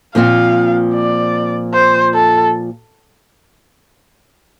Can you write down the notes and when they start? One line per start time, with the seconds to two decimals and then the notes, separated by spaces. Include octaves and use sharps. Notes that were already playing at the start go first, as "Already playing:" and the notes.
0.15 A#2 F3 C4 F4 F5
0.94 D5
1.73 C5
2.14 A4